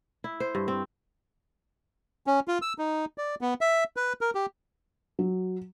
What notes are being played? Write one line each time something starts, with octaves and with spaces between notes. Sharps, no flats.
E4
C5
G2
C4
C#4
F4
E6
D#4
D5
B3
E5
B4
A#4
G4
F#3